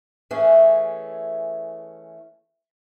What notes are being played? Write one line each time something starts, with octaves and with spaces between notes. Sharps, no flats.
E3 A3 C#4 G#4